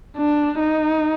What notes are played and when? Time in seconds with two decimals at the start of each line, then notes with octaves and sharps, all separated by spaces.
0.17 D4
0.60 D#4